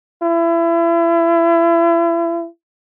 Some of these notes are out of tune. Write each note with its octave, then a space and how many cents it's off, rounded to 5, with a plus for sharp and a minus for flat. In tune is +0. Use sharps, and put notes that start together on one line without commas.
E4 +35